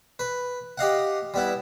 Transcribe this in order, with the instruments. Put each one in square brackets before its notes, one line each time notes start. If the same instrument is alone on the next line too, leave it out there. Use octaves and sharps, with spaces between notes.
[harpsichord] B4
G4 D#5 F5 F#5
G3 B3 E4